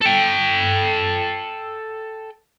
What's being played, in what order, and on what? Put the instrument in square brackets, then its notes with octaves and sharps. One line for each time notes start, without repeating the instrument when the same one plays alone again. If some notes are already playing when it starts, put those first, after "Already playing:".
[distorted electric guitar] A4 G5